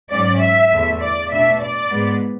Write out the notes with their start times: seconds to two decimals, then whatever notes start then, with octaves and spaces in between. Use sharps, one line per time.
0.11 G#2 F#3 C#4 D5
0.41 E5
0.71 E2 D3 A3
1.01 D5
1.31 B2 A3 D4 E5
1.62 D5
1.91 G#2 G#3 B3